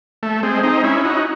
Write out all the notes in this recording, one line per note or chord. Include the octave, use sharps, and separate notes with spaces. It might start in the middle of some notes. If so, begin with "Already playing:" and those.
A3
G#3 C4
C4 D#4
C#4 E4
D#4 F#4